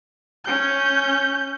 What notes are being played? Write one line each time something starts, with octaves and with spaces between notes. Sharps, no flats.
C#4 G6